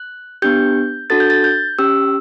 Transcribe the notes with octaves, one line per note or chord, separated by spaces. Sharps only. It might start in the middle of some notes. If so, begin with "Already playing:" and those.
Already playing: F#6
B3 D4 G4 G6
D4 F#4 A4 A6
G6
A6
G6
C#4 G4 E6